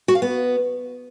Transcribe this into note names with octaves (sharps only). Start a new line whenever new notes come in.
F#4
F5
B3